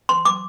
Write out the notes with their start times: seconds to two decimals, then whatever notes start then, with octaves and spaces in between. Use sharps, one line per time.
0.09 C6
0.25 D6